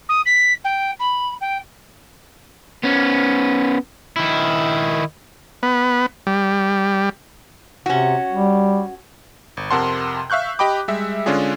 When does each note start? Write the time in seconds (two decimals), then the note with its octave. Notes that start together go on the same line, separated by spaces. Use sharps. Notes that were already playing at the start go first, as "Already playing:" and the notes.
0.09 D#6
0.26 B6
0.64 G5
0.99 B5
1.41 G5
2.84 B3 C#4
4.16 D#3 E4
5.63 B3
6.27 G3
7.86 C3 C#4 F#4
8.32 G3
9.57 G1
9.71 F2 C3 A#4 F#5 A5 C6
10.30 E5 F5 C#6 F#6 G6
10.59 G4 D#5 G5 B5 D6
10.88 G3 G#3 E5
11.26 D3 G#3 C#4 D4 F4 G#4